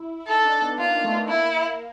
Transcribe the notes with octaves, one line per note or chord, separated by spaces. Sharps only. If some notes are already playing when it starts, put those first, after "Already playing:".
Already playing: E4
E4
D#4 A4
D4
B3
A#3 F4
A#3
A3
A3
A#3 E4